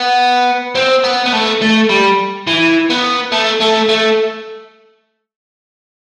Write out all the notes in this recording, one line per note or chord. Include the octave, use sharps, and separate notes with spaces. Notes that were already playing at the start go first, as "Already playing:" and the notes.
Already playing: B3
C4
B3
B3
A3
A3
G3
E3
B3
A3
A3
A3